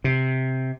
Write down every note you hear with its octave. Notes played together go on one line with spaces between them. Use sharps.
C3